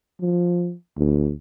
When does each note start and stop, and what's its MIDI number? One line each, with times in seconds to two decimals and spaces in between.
0.21 0.74 53
0.97 1.32 38